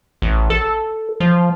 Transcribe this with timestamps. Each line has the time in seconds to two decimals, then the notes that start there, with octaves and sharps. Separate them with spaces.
0.22 A1
0.50 A4
1.20 F3